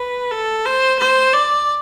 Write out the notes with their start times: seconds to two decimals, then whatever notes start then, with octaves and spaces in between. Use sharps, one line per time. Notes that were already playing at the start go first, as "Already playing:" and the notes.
Already playing: B4
0.31 A4
0.65 C5
0.99 C5
1.34 D5